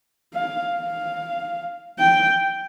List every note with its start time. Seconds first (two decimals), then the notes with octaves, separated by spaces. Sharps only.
0.33 F5
0.75 F5
1.98 G5